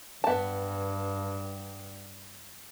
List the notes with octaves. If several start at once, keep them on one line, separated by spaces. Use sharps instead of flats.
G2 B3 A5